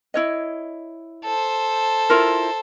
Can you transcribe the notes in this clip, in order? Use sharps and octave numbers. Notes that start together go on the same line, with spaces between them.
E4 C#5 D#5
A4 C5
E4 F4 A#4